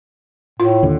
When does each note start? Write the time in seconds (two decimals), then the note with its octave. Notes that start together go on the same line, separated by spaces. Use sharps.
0.60 A2 F4
0.83 D#2 D3